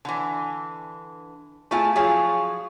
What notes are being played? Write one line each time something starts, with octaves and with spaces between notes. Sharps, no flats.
D3 E3
A3 C4 E4 F4 G#4
F3 F#3 F4 G#4